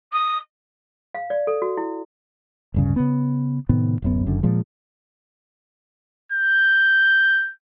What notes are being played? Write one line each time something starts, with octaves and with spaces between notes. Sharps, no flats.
D#6
F5
D5
A4
F#4
E4
D1 G2 C#3
C#3 B3
A2 C3 D#3 B3
D1 F#2 B3
F#1 F#2 D3
A#2 F3 G#3
G6